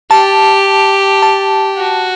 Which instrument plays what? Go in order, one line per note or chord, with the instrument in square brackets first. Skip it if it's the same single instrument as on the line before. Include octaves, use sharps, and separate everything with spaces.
[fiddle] G4 [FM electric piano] A5
[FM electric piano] A5
[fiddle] F#4